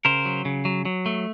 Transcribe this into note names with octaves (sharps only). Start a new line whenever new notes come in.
C#3 A#4 C5
F#3
C#3
F#3
F#3
A3